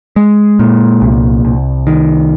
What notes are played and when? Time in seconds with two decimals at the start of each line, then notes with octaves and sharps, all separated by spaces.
0.16 G#3
0.59 A#2
1.02 C2
1.45 C2
1.87 D#3